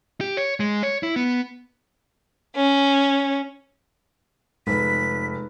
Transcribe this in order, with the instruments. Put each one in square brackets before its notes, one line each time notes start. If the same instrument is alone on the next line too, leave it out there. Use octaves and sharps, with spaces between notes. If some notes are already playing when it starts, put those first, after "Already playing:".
[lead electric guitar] G4
C#5
G#3
C#5
E4
B3
[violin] C#4
[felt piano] F1 [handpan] G#3 D#4 B4 [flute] B6